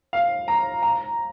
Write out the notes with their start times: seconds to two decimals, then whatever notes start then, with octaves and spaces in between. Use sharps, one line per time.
0.13 F5
0.48 A#5
0.83 A#5